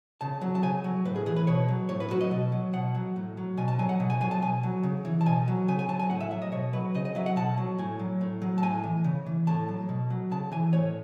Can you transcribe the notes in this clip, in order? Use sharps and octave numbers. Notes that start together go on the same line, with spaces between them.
C#3 A5
F#3
A5
C#3 G#5
F#3
A2 B4
G#4
E3 G#4
B4
B2 C#5
F#3
A2 C#5
B4
F#3 F#4
D#5
B2
F#3
B2 F#5
F#3
A2
F#3
B2 G#5
A5
F#3 G#5
F#5
B2
G#5
F#3 G#5
A5
B2 G#5
F#3
C#3
E3
A5
B2 G#5
F#3
C#3 G#5
G#5
F#3 A5
G#5
A2 F#5
E5
F#3 E5
D#5
B2 C#5
F#3 B4
C#3 D#5
D#5
F#3 E5
F#5
B2 A5
F#3
A2 G#5
F#3
A2
F#3
A5
A2 G#5
E3
C#3
E3
A2 A5
F#3
B2
F#3
C#3 A5
E3 G#5
A2 C#5